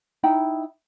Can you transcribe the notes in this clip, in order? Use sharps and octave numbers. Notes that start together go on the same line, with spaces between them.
D#4 E4 G5 B5